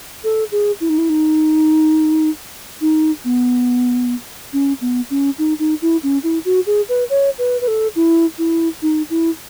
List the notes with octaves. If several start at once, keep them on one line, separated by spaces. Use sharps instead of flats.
A4
G#4
E4
D#4
E4
D#4
D#4
B3
C#4
B3
C#4
D#4
D#4
E4
C#4
E4
F#4
G#4
B4
C#5
B4
B4
A4
E4
E4
D#4
E4